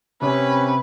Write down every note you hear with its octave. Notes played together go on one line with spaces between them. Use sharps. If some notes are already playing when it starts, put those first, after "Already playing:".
C3 C#4 B4